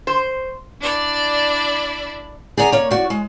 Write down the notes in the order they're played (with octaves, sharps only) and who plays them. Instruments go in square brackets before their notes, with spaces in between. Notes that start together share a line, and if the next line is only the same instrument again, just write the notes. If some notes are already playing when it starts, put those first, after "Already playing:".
[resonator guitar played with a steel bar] C5
[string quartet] D4 E4 D5
[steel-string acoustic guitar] G#4 D5 F#5 G#5 A#5
A#3 C#5
F#4 D5
G#3